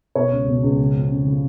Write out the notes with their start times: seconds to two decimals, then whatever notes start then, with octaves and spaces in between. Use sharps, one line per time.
0.15 B2 C#5
0.32 C#2
0.48 B2
0.63 C#2
0.79 C#3
0.95 F2
1.10 C#3
1.26 C#3